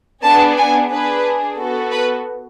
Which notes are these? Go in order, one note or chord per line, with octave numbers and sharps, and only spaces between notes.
B3 D4 G#4 A5
G#5
D4 G#4 B4
B3 F#4 A4
B4